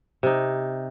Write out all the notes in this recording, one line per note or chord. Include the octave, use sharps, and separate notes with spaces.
C3 D#4